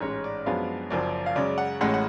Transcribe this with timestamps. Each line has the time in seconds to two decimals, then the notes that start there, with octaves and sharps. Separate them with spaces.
0.01 A1 G#2 G#3 C#4 C#5
0.24 D5
0.46 F#2 F3 G#3 B3 D4 F5
0.90 F#1 F#2 F3 D5
1.26 F5
1.35 F#2 C#3 G#3 C#4 D5
1.58 F#5
1.81 A1 A2 G#3 C#4 F#5
1.94 F#5